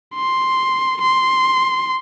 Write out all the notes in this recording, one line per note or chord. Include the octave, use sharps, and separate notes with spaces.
C6
C6